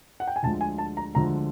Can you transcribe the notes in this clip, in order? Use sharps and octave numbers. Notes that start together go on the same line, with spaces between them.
F#5
G5
G#5
D2 D3 F3 G#3 A5
G#5
A5
A#5
D2 D3 F3 G#3 A#5